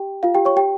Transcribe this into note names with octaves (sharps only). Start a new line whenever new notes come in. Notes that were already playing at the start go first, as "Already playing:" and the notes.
Already playing: G4 G5
F4 F5
G4 G5
C#5 C#6
G4 G5